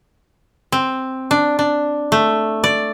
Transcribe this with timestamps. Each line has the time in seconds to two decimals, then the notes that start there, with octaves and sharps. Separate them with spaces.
0.72 C4
1.31 D4
1.59 D4
2.12 A3
2.64 D5